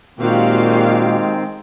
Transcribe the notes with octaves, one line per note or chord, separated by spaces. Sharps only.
A#2 D#3 G#3 C4 F#4 G4 F5